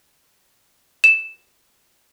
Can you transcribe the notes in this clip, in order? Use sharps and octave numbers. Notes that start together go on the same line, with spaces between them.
E7